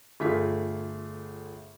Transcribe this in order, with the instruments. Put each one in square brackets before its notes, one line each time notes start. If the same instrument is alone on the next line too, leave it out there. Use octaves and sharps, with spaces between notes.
[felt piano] G1 A3 F4 G#4 B6